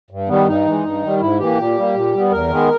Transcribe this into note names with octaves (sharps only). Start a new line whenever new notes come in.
G2
D#3 G3 B3
G2 D#4
E3 G#3
G2
D#3 G3
G#2 E4
E3 A#3 G4
A#2
G3 A#3
A#2
G3 B3
E2 A#4
D#3 G#3 B3